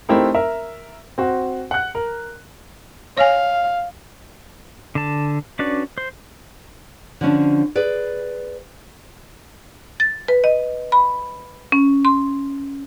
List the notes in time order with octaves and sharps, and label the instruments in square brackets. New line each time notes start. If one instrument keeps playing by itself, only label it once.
[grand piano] A3 C4 D#4 E4 G4 A#4
A#4 E5
C4 F#4
F#5 F#6
A#4
[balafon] C#5 G#5 [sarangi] F5
[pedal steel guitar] D3 A5
C#4 D4 F#4 B4 D5
C5
[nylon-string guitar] D3 F3 C#4 D4
G#4 B4 D5
[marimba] A6
B4
D#5
B5
C#4
C6